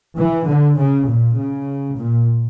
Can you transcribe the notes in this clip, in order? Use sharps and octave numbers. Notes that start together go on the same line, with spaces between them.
E3
D3
C#3
A#2
C#3
A#2